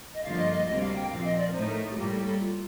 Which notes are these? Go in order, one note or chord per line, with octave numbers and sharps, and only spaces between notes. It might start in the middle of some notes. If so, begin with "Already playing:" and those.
D#5
G2 D3 F3 A#3 F4 F5
F5
D#5
D#5
D2 C3 G3 A#3 D#5
F5
G5
A#2 F3 C4 F5
D#5
D5
A#4
A2 A3 D#4 C5
A#4
G4
A2 G3 A#3 F4
A4
A4
F4